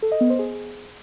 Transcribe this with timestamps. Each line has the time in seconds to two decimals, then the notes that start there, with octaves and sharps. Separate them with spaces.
0.02 A4
0.12 D#5
0.21 B3
0.30 C5
0.39 G#4